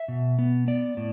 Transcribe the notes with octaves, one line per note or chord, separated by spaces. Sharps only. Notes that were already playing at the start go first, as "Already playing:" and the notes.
Already playing: E5
B2
B3
B3 D5
A2